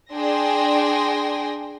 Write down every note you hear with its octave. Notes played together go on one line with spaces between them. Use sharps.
D4 G#4 G5 G#5 C6 A#6